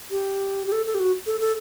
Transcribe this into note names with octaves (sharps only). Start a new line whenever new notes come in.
G4
G4
A4
A4
G4
F#4
A4
A4